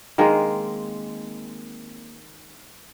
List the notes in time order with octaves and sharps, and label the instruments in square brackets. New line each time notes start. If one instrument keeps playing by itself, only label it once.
[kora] D#3 G#3 A#3 C4